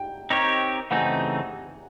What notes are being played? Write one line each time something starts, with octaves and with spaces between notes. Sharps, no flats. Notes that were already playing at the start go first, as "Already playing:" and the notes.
Already playing: G5
C4 D#4 G4 A#4 C#5
C#3 E3 A3 C4 D#4 F#5 G#5